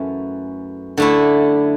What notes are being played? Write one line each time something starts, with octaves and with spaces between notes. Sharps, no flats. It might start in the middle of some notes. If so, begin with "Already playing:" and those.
Already playing: F#2 E3 A3 C#4
D3 A3 E4